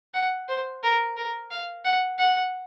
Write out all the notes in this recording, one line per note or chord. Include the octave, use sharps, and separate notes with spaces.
F#5
C5
A#4
A#4
F5
F#5
F#5